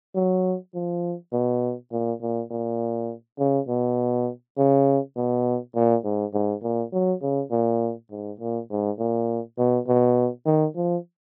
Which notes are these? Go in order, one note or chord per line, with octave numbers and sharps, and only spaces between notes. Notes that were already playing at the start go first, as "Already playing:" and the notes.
F#3
F3
B2
A#2
A#2
A#2
C#3
B2
C#3
B2
A#2
G#2
G#2
A#2
F#3
C#3
A#2
G#2
A#2
G#2
A#2
B2
B2
D#3
F3